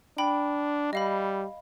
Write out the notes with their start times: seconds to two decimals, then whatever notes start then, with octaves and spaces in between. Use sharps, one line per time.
0.18 D4 G5 B5
0.93 G3 D#5 F5 B5